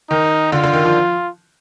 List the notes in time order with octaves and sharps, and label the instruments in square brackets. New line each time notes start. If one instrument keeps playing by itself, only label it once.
[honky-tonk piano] D#3 [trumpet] D#4
[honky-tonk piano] D3 [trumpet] F4
[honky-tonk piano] D3
D#3
F3